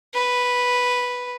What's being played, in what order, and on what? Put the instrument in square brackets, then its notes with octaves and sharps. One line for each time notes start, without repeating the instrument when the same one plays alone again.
[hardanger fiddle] B4